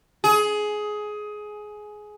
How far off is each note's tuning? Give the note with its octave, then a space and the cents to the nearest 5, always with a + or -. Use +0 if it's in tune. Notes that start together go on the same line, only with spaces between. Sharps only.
G#4 +15